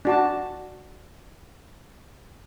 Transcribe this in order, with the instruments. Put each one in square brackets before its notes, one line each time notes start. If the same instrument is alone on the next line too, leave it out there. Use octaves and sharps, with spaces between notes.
[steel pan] D4 F#4 A5